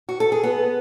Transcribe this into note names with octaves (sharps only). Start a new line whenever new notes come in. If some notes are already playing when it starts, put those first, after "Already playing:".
F#4
A4
G#4
B3